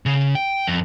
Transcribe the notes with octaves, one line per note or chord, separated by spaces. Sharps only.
C#3
G5
F2